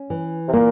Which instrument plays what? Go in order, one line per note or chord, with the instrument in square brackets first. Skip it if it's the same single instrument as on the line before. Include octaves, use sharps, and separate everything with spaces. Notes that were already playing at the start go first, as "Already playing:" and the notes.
Already playing: [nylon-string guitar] C#4
E3
[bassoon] C3
[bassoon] A#2 [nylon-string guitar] A#3